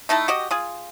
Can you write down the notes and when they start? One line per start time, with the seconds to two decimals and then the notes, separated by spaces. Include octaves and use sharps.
0.09 A3 D#4 E4 A4
0.28 F#4 G4 D#5
0.51 F4 G#4